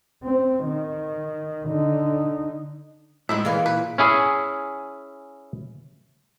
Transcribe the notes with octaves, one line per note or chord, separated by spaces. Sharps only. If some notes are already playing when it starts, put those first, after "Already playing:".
C4
D#3
D3 D#4
A2 D#3 G#3 E4 E5
A#2 E3 A#3 G#4 F5
B4
C#4 E4 G#4